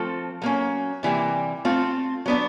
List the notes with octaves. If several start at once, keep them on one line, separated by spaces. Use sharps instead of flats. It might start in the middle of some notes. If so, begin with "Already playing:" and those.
Already playing: F3 A3 C4 F4 A4
F#3 A#3 C#4
C3 E3 G3 A#3
A3 C4 F4
F#3 B3 D4